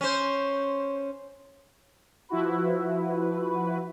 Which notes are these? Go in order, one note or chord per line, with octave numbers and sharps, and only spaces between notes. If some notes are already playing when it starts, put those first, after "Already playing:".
C#4 C5
F3 E4 F#4 B4